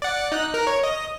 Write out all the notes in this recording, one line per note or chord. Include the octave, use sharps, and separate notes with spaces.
D5 F#5
D#4 F#6
A#4
C#5
D#5